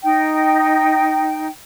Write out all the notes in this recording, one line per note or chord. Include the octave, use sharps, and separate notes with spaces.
D#4 G5